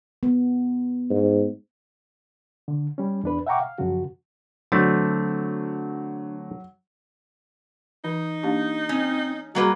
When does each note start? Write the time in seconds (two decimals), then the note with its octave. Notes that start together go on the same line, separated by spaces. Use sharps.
0.23 B3
1.10 G#2
2.68 D3
2.98 G3 C#4
3.24 E2 D4 B4
3.47 E5 F#5 G5 A#5 C#6 D6
3.60 F5
3.78 F#2 C#3 F3 F#3 F#4
4.72 D3 F#3 A3 C4 D4
8.05 E3 D#4
8.43 A#3 D4 G4
8.89 C4 C#4
9.55 F#3 G3 A#3 F#4 G#4 B4